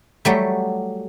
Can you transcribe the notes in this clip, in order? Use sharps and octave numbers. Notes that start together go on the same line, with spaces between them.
F#3 G3 A3